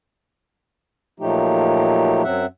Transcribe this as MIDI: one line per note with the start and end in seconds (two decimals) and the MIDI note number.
1.20 2.23 46
1.20 2.23 53
1.20 2.23 54
1.20 2.23 57
1.20 2.23 63
1.20 2.23 67
2.23 2.46 42
2.23 2.46 54
2.23 2.46 60
2.23 2.46 76
2.23 2.46 78